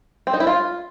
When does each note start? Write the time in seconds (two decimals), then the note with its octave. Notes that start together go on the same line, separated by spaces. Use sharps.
0.27 C4
0.34 D#4
0.40 E4
0.47 F4